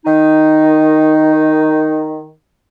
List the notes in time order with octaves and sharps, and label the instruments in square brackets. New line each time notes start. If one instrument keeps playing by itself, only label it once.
[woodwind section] D#3 D#4